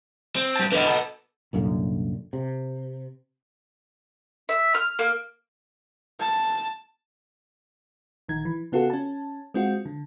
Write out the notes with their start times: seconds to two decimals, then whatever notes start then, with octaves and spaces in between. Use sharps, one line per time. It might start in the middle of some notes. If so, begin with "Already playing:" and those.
0.36 C4
0.56 G3 A5
0.72 E2 D3 B4 D#5
0.86 B3 A4
1.53 C2 F#2 A#2 D3
2.33 C3
4.49 E5
4.75 F6
4.99 A#3
6.20 A5
8.29 A#1 D#3 G#6
8.45 E3
8.72 C#3 B3 F4 F#4 A4
8.90 C#4 A5
9.54 G#3 C4 F4 F#4
9.85 D3